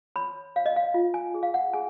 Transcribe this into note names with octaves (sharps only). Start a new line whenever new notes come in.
C#5 B5
C#5 F5
D#5
F5
F4 F5
G#5
G#4
F5
F#5
G#4 G#5